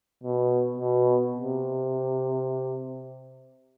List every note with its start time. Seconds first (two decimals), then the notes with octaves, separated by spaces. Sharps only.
0.23 B2
0.78 B2
1.32 C3